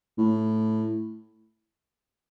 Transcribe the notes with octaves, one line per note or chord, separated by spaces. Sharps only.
A2